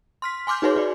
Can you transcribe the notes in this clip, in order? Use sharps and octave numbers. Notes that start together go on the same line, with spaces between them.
C6 F6 B6
G#5 C6 D6 F6 G6
D#4 F#4 G#4 B4 C#5 C6
F#4 D5